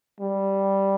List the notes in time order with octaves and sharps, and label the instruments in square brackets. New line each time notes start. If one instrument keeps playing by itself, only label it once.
[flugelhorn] G3